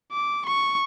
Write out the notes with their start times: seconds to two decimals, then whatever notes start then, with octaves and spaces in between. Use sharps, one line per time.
0.12 D6
0.46 C#6